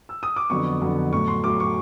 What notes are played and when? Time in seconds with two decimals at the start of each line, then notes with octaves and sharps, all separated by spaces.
0.09 E6
0.23 D#6
0.36 D6
0.50 F2 D3 F#3 B3 C#6
0.81 F2 D3 F#3 B3
1.13 A2 F#3 A3 C#6
1.28 C6
1.44 A2 F#3 A3 D6
1.60 C#6